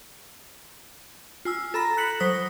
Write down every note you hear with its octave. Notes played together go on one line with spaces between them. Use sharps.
F4 G#5 E6
A4 A#5 B5 A#6
F#6 B6 C#7 F#7
F#3 C5 D#6 A#6 B6